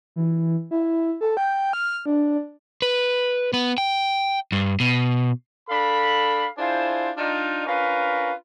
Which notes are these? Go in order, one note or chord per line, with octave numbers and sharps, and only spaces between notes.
E3
E4
A4
G5
F6
D4
B4
B3
G5
G2
B2
D4 A4 F5 B5
D4 E4 F4 G#4 C5
D4 D#4 F4
C#4 D4 F4 A#4 B4